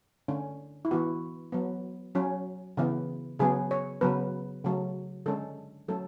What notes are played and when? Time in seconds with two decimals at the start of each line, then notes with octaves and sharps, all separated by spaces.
0.28 D3 A3 C#4
0.85 E4
0.91 E3 B3 F#4
1.52 F#3 B3
2.15 F#3 C#4
2.77 C#3 E3 B3
3.39 C#3 F#3 B3 G#4
3.71 C#5
4.01 C#3 F#3 B3 B4
4.65 C#3 F#3 A3
5.26 D3 G#3 C#4 A4
5.88 F#3 A3 C#4 A4